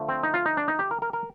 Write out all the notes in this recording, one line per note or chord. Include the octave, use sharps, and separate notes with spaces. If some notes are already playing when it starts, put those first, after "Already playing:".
Already playing: D3 F3 A3
C4
D#4
F4
D#4
D4
D#4
G4
A#4
A#4
A#4